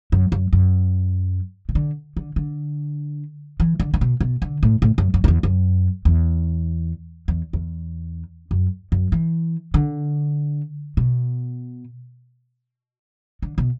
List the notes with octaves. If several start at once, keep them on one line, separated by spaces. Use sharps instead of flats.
F#2
F#2
F#2
B2
D3
D3
D3
E3
D3
D3
B2
B2
D3
A2
A2
F#2
F#2
F#2
E2
F#2
E2
E2
E2
F#2
F#2
E3
D3
B2
D3
B2